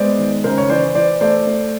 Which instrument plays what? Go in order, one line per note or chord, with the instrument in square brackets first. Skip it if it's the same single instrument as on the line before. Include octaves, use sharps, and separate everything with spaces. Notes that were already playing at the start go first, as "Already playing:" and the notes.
Already playing: [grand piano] G#3 B3 C5 D5
D#3
C#3 A#4 C5
C#5
E3 C5 D5
E3 C5 D5
A3 C5 D5
A3